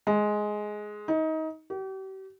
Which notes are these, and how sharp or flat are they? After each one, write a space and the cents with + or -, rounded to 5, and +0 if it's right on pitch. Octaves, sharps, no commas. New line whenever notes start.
G#3 +10
D#4 +25
G4 -40